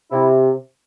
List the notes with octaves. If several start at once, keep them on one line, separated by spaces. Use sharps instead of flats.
C3 E4